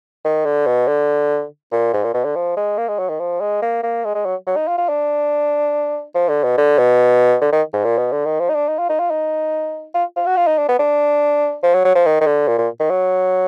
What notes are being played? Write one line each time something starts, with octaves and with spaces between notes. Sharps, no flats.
D#3
D3
B2
D3
A#2
G#2
A#2
B2
D3
F3
G#3
A#3
G#3
F#3
D#3
F3
G#3
A#3
A#3
G#3
G#3
F#3
F#3
D#4
F4
F4
D4
F3
D3
B2
D3
B2
D3
D#3
G#2
A#2
B2
D3
D#3
F3
D#4
D4
D#4
F4
D#4
F4
D#4
F4
F4
F#4
F4
D#4
D4
B3
D4
F3
F#3
F#3
F3
D#3
D#3
D3
A#2
A#2
D#3
F#3